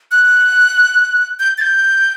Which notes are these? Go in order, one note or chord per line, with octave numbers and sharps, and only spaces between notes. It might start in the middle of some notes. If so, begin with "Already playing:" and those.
F#6
G6
A6
G6